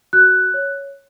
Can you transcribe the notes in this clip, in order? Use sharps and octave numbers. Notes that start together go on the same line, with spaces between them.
F#4 F#6
C#5